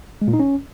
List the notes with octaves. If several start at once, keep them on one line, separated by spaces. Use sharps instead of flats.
G#3
A#2
D#4
C#4